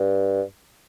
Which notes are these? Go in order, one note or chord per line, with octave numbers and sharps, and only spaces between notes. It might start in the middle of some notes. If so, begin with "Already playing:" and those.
Already playing: G2